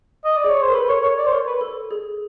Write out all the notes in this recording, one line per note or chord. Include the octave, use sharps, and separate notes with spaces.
D#5
D5
G#4
C#5
C5
A#4
A4 B4
A#4 C#5
A#4 C#5
D5
C5
A#4 C#5
B4
A4
G#4